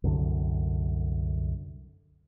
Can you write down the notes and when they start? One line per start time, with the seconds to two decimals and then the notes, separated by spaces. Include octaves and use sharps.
0.04 C2 F#2 D3